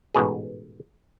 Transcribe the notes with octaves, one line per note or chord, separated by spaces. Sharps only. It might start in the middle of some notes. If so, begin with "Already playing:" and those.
A1 G#2 B2 G#4